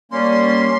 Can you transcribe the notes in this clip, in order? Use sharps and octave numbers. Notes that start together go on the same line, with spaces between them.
G3 A#3 C#4 C6